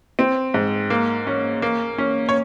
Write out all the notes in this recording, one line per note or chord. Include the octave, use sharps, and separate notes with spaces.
C4
G#2
A#3
C#4
A#3
C#4
C#5